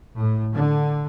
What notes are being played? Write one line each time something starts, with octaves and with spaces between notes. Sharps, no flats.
A2
D3